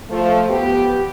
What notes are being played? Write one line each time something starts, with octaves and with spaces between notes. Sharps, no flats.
F3 A3
B3 G4